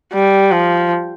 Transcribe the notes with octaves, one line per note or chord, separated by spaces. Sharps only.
G3
F3